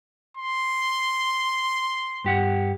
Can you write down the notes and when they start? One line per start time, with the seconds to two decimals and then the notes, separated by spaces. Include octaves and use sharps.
0.37 C6
2.24 G2 G4 F#5